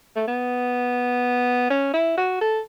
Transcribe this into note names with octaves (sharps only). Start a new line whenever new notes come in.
A3
B3
C#4
E4
F#4
A4